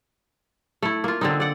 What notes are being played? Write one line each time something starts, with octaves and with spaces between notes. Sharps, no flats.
A3 E4
A#3 F4
D3 C4 D#4
D5 F#5